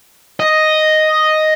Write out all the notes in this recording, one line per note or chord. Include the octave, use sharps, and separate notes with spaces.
D#5